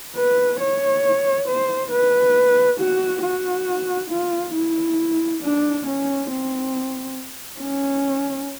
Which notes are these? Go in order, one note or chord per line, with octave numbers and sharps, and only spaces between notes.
B4
C#5
C5
B4
F#4
F#4
F4
E4
D4
C#4
C4
C#4